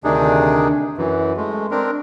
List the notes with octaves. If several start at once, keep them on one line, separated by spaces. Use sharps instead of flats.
D2 C3 D#3 D4 D#4 G#4
F#2 E3
G#3 A3
C4 D4 A#4